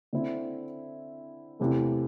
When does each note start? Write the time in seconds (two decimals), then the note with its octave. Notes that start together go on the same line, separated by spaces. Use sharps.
0.13 D3 C4 E4
1.60 E2 C3 E3 A3